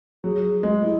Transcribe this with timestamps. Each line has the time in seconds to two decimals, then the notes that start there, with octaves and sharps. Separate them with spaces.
0.24 F#3 G#4
0.63 G#3
0.82 G#3 E4